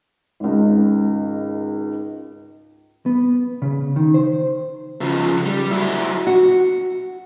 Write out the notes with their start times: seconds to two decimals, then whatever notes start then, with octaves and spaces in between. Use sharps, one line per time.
0.40 G#1 C#2
3.06 B3
3.62 C#3
3.96 D#3
4.14 C5
5.01 C#3 F3
5.46 G3
5.71 F#3 E4
6.27 F#4